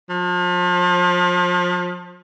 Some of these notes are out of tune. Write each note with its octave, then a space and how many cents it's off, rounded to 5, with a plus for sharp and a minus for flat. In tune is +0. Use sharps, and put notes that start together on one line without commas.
F3 +35